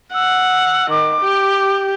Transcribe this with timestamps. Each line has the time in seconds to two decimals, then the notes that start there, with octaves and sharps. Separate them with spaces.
0.14 F#5 E6
0.90 D#3 D6
1.21 G4